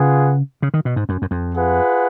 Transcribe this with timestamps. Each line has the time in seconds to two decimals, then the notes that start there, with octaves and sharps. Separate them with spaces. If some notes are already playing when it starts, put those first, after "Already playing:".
Already playing: C#3 F4 G#4 B4 F#5
0.62 C#3
0.74 D#3
0.85 B2
0.96 G#2
1.09 F#2
1.22 F#2
1.31 F2
1.54 F4 G#4 B4 F#5